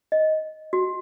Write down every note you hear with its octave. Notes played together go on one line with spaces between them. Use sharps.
D#5
F#4